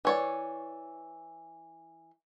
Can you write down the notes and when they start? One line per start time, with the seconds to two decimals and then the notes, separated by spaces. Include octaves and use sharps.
0.05 E3 C#5 D5